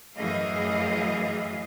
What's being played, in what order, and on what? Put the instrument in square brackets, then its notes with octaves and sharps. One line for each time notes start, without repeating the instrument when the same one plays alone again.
[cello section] F#2 A2 E3 G#4 D#5 F5